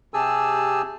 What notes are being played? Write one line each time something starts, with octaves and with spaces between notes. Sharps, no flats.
C3 G4 G#4 G#5 A5 E6